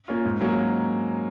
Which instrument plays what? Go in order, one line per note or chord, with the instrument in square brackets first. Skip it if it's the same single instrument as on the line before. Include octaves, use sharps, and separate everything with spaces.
[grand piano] A#3 C#4 F4
G#2
F#3 A#3 C#4